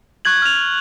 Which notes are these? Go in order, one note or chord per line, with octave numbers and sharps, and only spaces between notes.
C#6 F#6 G#6 F#7
F6 F7